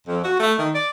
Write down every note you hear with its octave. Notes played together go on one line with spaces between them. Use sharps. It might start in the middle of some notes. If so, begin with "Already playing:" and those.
F2
F#4
A3
D#3
D5